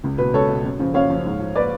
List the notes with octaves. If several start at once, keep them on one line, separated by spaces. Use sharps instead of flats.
C#2
B2 B4
C#2 A4 C#5
B2
F#2
C#3 F3
F#2 C#5 F5
C#3 F3
G#2
F3
B4 D5